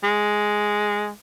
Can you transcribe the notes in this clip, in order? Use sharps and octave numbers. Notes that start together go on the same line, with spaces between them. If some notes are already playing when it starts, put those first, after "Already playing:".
G#3